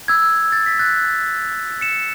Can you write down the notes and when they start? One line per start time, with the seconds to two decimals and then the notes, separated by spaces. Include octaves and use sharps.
0.08 E6 G#6
0.52 A6
0.66 B6
0.79 F#6 A6
1.81 C#7 E7